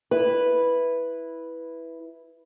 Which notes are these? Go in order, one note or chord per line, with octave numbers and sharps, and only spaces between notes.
E4 B4